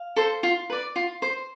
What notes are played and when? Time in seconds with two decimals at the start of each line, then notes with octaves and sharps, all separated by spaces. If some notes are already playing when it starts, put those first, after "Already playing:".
Already playing: F5
0.16 A4 C5
0.43 F4
0.70 B4 D5
0.96 F4
1.22 C5